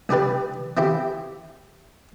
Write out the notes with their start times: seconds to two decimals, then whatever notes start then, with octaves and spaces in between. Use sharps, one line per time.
0.09 C2 D4 G4 B4 D5
0.77 C4 E4 G4